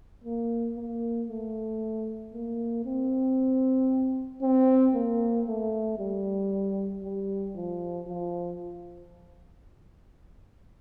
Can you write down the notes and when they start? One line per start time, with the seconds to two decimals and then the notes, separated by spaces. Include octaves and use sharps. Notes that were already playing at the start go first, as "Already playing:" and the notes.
0.24 A#3
0.77 A#3
1.29 A3
2.34 A#3
2.86 C4
4.42 C4
4.94 A#3
5.47 A3
5.99 G3
7.04 G3
7.56 F3
8.08 F3